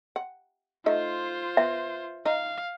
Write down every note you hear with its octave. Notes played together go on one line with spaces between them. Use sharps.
F#5
A3 D#4 F4 C5 E5
B3 E5
D#4 F5